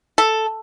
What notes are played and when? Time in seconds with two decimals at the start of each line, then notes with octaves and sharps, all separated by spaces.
0.18 A4